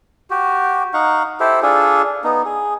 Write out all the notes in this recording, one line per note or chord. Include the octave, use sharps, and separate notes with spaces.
F#4 G4
D#4 F5 F#5 C#6
E4 G4 A4 C5
D4 F4 G#4 A4
B3 D#4
G#4